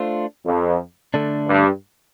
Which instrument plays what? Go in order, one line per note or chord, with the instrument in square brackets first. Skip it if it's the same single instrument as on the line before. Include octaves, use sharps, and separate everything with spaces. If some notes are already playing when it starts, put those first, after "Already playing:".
Already playing: [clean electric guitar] A3 D4 F4 C5
[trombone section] F2
[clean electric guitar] D3 A3 D4
[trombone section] G2